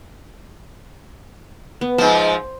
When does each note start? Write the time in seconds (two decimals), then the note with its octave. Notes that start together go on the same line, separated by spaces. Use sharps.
1.81 B3
1.98 G#2 F3 C5